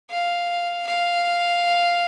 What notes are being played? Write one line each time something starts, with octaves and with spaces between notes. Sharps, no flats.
F5
F5